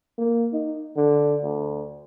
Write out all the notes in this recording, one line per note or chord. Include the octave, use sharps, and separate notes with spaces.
A#3
D#4
D3
D2